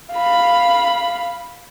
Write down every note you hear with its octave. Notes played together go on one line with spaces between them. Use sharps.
F5 B5